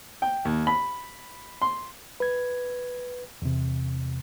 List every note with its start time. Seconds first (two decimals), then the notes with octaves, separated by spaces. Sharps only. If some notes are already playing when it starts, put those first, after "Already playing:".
0.22 G5
0.45 D#2
0.67 B5
1.62 C6
2.20 B4 G#6
3.42 E2 C3